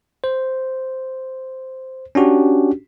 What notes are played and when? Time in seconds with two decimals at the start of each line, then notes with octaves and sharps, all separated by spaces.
0.24 C5
2.15 C#4 D4 F#4 G4